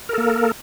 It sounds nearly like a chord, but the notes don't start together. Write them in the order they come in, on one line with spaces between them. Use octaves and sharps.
A#4 A4 A#3